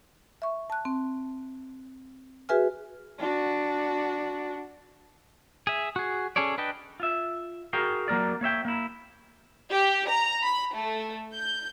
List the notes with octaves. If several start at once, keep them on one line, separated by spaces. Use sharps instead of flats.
E5 C#6
A5 F#6
C4
F#4 G#4 B4 E5 G#5 F6
D4 F#4
G#4 E5
F#4 G#4
C#4 G#4 A4 C#5 D5
D4 B4 D#5 G5 A5
F4 E5
F#4 G#4 A#4 F5 G5
F#3 A#3 A#4 D5
A#3 C#5 E5 G5
A#3 E4
G4
A#5
B5
A3
G6